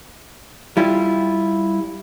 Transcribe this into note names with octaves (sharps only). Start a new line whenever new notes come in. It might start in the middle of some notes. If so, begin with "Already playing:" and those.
G3 E4 F4